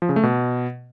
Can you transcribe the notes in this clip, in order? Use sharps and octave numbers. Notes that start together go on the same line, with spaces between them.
F3
C#3
A3
B2